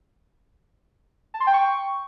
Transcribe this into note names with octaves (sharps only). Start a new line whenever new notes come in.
A5
C6
G5
C#6